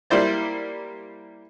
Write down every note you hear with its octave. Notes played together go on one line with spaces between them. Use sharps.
G3 A#3 E4 C5 D5